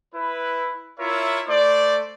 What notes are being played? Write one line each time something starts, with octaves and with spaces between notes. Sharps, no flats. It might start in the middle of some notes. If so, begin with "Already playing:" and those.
E4 B4
E4 F4 A#4 C#5 E5
A3 C5 D5